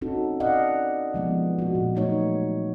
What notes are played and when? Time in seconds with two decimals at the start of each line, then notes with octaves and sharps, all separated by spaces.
0.01 C4 C#4 D#4 F#4 A4
0.40 D5 D#5 F5 F#5
1.14 F3 G#3 B3
1.59 G#3 A#3 F#4
1.75 A#2
1.95 F#3 A3 D#4 C#5